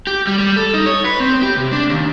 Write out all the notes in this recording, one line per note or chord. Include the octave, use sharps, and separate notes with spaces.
G4
G3
G3
A4
D#4
C#5
B4
C4
G4
C3
D4
D#2